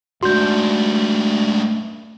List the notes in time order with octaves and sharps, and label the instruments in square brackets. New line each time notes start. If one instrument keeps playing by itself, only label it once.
[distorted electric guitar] G#2 D4 [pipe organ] A3 [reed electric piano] F#4 [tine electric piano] C6 G6